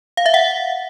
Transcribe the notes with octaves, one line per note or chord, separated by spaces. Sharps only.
F5
E5
F#5